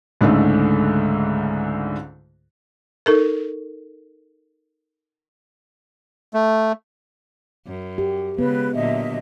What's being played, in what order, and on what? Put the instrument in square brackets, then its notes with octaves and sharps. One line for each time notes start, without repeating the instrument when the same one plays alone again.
[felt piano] C#2 G#2 D3 A3
[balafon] D#4 A4 A#4
[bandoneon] A3
[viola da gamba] F#2
[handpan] G4
[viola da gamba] C#3 G#3 [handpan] B3 [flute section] B4
[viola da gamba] A#2 D3 F#3 [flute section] D#5 E5